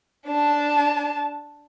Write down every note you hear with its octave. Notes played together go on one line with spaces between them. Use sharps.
D4 A5